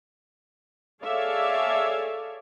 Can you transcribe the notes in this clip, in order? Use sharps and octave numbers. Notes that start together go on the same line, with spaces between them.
G#4 A4 C#5 D5 E5 F5